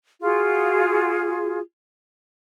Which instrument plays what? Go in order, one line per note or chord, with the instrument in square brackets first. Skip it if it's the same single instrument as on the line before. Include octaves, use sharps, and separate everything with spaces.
[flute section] F4 F#4 G#4